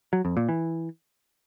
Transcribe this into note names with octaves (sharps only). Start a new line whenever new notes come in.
F#3
F2
A#2
E3